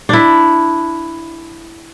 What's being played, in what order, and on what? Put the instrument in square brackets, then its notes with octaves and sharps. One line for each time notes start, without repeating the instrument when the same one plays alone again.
[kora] D4 E4